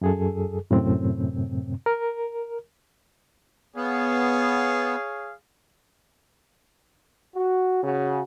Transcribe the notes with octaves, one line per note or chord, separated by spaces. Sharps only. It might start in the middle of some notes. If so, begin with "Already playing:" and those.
F#2 G#4 A4
F#2 A2 C3 C4
A#4
B3 G#4 C#5 F5
F#4
C#3 F#4